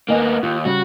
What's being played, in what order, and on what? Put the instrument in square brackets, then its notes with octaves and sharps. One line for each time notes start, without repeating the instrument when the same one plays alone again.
[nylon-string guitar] D#2 D#5 G#5 [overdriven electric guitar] A#3 B3
[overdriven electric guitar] D#2 [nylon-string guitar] F4
[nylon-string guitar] C#3 G3 [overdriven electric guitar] F#4